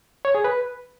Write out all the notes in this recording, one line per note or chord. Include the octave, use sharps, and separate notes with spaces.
C#5
G#4
B4